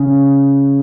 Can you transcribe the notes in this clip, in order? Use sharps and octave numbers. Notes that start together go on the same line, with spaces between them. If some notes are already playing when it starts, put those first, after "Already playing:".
Already playing: C#3